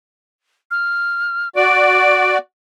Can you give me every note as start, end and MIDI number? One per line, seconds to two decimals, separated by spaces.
0.71 1.49 89
1.56 2.38 66
1.56 2.38 74
1.56 2.35 98